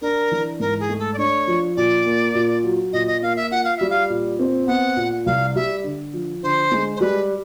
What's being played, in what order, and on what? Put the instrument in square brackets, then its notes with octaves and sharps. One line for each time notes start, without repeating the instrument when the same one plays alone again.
[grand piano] D4 [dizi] A#4
[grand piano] E3
[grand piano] G#2 [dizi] A#4
[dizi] G#4
[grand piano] A3
[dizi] A4
D5
[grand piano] D4 [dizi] C#5
[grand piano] F3
[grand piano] A#2 [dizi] D5
[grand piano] A#3
A#2
F#3
[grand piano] A#2 [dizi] D#5
[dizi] D#5
[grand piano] A#3 [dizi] F5
[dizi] E5
[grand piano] F4 [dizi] F#5
[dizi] F5
[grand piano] G3 [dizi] E5
[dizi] F5
[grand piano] A#2
C4
[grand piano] B3 [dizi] F#5
[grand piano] A#2
[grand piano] C2 [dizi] F5
[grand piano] G3 [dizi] E5
[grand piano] D3
F3
[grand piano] D3 [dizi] C5
[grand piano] G#3
[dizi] C5
[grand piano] G3 [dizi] B4